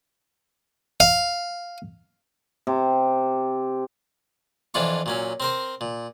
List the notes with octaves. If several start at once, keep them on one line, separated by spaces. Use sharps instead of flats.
F5
C3
F2 E3 D4 F4 C#6
A#2 F#3 C#4
C4 A#4 C5
A#2